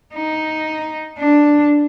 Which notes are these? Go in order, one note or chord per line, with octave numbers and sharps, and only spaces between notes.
D#4
D4